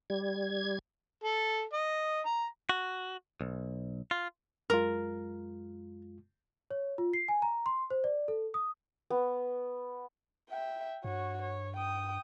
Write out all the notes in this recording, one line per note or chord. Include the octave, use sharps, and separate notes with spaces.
G3 G#6
A4
D#5
A#5
F#4
B1
F4
F#2 G#3 F4 A#4
C#5
F4
C7
G#5
A#5
C6
C5
D5
A4
D#6
B3
E5 G5
G2 F#4 C#5
C#5
G5 D#6